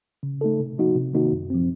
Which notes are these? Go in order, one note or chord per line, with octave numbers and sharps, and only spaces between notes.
C#3
A3 D#4 A4
C3
F3 A#3 D#4 F#4
C3
D#3 A#3 D#4 F#4
F#2
F3 C4